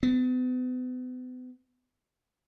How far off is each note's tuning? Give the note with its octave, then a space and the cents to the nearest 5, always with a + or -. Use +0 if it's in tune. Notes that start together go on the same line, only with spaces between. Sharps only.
B3 +40